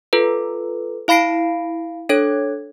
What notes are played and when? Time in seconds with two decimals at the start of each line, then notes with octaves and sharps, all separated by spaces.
0.13 F4 A4 B4
1.08 E4 F5 B5 A#6 C7 D7
2.09 D4 A4 C#5 G#6